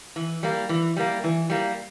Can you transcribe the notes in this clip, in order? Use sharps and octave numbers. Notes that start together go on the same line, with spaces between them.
E3
G3 A#3
E3
G3 A#3
E3
G3 A#3